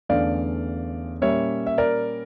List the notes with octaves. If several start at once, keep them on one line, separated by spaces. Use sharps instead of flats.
E2 D3 A3 C#4 D5 F5
A#2 G3 A#3 C#4 C#5 E5
E5
A#4 D5